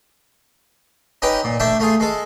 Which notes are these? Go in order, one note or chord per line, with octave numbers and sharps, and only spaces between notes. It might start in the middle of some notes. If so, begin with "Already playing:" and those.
C#4 D#4 G4 B4 G5
A#2
A3 D4 E5 G5
A3 F4 G#4
G#3 A4